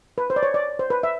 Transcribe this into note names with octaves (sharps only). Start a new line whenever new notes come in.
B4
C5
D5
C#5
D5
C5
B4
E5